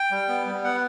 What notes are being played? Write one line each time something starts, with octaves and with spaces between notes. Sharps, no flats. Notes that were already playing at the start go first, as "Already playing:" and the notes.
Already playing: G5
G3
B3
G3
B3 F#5